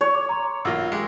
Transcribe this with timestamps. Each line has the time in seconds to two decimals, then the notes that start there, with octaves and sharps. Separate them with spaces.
0.01 C#5
0.15 D6
0.29 A#5 C6
0.65 B1 A#3 F4 E6 A#6
0.92 G#3 G4